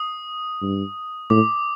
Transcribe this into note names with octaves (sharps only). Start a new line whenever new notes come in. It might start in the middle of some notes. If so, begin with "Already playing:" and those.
Already playing: D#6
G2
A2 D6